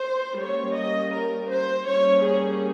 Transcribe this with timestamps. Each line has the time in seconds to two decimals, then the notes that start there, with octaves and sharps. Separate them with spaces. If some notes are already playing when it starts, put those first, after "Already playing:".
Already playing: C5
0.38 G3 A#3 C#4 C#5
0.75 D#5
1.13 A#4
1.50 C5
1.87 G3 A#3 C#4 C#5
2.24 G#4